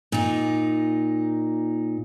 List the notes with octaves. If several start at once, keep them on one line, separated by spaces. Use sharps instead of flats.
A#2 D#4